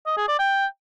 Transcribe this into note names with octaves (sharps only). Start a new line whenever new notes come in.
D#5
G#4
D5
G5